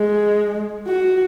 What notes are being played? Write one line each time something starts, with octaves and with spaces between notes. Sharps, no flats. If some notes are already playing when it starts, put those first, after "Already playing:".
Already playing: G#3
F#4